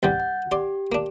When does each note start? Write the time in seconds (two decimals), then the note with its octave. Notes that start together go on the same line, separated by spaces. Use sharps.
0.03 C2 G2 G3 F#5 G6 A6
0.20 F#5
0.51 G4 D5 C6
0.92 A#3 D4